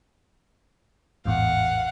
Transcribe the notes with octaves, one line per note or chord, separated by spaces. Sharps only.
A1 E2 G#2 F5 F#5